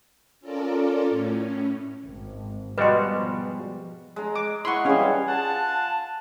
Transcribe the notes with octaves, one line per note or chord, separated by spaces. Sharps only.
C#4 F4 A4 A#4 D5
A2 C#4
G#1
B2 F3 G3 G#3 F#4 B4 D#5 C6
G#3 A#5
D6
E4 D#5 F#5 C6 C#6
E3 G3 C#4 G#4 F5 C#6
G#5 A5
F4 F#5 G#5 A5